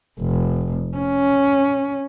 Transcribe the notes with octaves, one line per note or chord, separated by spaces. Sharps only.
F1
C#4